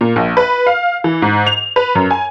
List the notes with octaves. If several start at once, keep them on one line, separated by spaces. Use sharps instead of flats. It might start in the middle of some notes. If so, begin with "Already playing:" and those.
A#2
A#1
B4
F5
E3
G#2
F7
B4
F#2
G#5